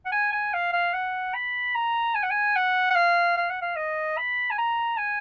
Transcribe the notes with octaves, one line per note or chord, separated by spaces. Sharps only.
F#5
G#5
G#5
F5
F5
F#5
B5
A#5
G#5
F#5
G#5
F#5
F#5
F5
F5
F#5
F5
D#5
B5
G#5
A#5
G#5